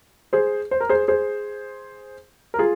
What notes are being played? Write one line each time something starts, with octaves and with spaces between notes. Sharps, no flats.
G#4 C5
C5
A#4
G#4 C5
G#4 C5
A#4
F4 G#4